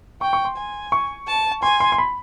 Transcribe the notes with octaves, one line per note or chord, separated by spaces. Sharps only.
G5 C#6
C#6
C6
G#5
C#6
A5
G#5 C6
C6
C6
B5